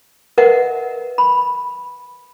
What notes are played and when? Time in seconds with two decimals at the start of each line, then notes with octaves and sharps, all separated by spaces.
0.38 A#4 B4 D#5 E5 F#5
1.18 B5